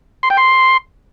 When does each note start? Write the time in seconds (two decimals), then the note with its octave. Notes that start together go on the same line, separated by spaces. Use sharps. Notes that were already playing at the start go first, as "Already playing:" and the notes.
0.23 C6
0.30 G5
0.37 C6